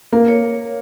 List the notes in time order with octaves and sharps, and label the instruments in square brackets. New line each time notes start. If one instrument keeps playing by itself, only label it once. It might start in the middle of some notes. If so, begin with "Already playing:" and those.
[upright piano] A#3 [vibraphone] A#4
[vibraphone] C#5